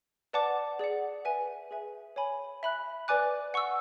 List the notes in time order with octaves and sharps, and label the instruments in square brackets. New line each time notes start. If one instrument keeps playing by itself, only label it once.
[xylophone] B4 D5 F#5 A5 D6
G#4 D5 F#5
B4 E5 G#5
G#4 B4 E5 G#5
C#5 G#5 B5
E5 B5 F#6
B4 D5 G#5 D6 F#6
F#5 C#6 E6